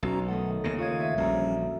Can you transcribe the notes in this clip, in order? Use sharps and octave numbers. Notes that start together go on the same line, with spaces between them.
B1 C#4 F#4 A#5
D#3 A3 A4 F#5
D#2 C#3 B3 A#6
F4 C#5 D#5 F5 G#6
E5
A#1 E2 D3 G3 C#4 F#4 A#5